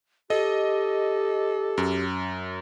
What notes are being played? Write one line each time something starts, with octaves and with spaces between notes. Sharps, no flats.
G4 A4 D#5
F#2